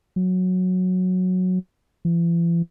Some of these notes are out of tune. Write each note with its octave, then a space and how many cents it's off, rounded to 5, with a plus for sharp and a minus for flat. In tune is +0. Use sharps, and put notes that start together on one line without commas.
F#3 -10
E3 +45